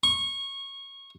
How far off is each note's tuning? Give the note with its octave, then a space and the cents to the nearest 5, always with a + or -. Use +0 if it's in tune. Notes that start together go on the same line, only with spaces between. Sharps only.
C#6 -20